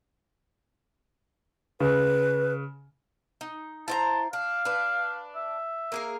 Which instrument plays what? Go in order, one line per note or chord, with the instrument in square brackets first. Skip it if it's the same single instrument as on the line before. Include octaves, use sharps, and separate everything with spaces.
[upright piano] C#3 [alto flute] B4
[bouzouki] D#4
[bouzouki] E4 C5 A#5 [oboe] A5
[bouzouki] D4 [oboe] F5
[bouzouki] D4 B4
[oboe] E5
[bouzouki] A#3 G#4 A#4